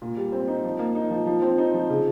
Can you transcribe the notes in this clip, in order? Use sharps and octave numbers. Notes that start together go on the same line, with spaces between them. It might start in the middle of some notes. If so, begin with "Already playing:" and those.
A#2
G3
C4
D#4
F3
A#3
D#4
F3
F3
C4
D#4
F3
C#3